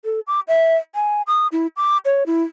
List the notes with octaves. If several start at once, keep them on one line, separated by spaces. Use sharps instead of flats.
A4
D6
E5
G#5
D#6
E4
D6
C#5
E4